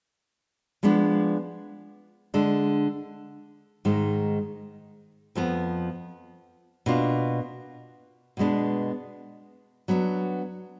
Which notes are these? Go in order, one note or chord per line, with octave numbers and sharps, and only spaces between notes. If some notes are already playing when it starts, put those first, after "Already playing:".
F3 G#3 B3 D4
D3 G#3 D4
G#2 D#3 G#3
F2 F3 B3
B2 A#3 D4 F4
B2 G#3 B3 D4
F#3 B3 D4